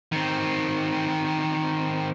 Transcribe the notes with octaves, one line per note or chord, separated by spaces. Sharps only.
D#3 C4